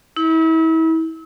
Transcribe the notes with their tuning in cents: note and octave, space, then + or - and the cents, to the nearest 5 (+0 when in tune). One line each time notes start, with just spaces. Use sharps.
E4 -35